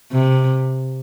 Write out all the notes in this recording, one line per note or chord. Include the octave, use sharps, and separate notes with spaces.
C3